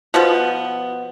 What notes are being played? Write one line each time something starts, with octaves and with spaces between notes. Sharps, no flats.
B2 F3 B3